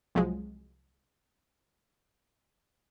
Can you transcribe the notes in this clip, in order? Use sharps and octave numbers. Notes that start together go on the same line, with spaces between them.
C2 F3 F#3 G#3